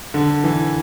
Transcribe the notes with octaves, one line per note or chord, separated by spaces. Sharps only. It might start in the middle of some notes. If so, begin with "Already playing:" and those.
D3
E3